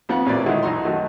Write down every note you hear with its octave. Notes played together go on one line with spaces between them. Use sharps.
F2 F3 B3 F5 F#5
A1 A#2 B4 C5 D5
D3 D#3 F#3 G#3 D#4 E4
B1 E3 D#4 F#4 A#5 C6
F#2 D#3 F#3 A3